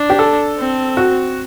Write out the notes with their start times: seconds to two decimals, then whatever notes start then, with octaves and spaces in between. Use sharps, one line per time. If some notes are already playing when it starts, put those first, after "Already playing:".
Already playing: D4
0.10 G4
0.19 A4
0.58 C4
0.97 F#4